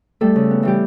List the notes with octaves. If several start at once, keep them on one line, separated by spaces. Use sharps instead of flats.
G3 A3 A4
C#3
B3
E3 G3 G4